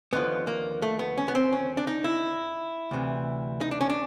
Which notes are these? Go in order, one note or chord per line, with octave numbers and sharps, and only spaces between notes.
D#2 D3 F3 B3
A#3
A3
B3
C#4
B3
C4
C#4
D4
D#4
E4
D2 C3 E3
D#4
D4
C#4
D4